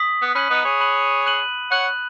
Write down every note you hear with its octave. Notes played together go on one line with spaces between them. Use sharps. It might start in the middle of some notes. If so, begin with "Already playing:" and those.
Already playing: D#6 B6 F#7
B3
C#4 B5 F#6 D#7 F#7
B3 D#4
G#4 C#5
B5 F#6 D#7 F#7
F#6 D#7 F#7
C#5 F#5 F#6 D#7 F#7